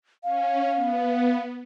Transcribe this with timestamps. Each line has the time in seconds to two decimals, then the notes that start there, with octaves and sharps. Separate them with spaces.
0.24 C#4 F5
0.75 B3